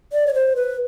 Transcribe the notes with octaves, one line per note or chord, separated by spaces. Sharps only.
D5
C#5
C5
B4